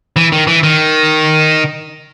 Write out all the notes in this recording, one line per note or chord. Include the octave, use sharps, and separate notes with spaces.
E3
D#3
E3
D#3